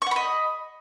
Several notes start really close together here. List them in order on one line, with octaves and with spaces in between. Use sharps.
C#6 F#5 B5 D#5